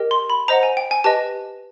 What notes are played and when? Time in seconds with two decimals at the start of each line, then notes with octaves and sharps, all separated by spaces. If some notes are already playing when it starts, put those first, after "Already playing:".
Already playing: G4 A#4 D#5 G5
0.11 C6
0.30 B5
0.48 C5 D#5 F#5 A#5
0.63 G#5
0.77 G5
0.91 G#5
1.04 G4 B4 D#5 A5